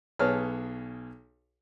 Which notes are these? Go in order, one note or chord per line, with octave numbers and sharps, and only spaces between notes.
B1 G#4 B4 C#5 A5 F6